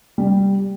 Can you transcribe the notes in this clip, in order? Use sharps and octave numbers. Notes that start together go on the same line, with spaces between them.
G3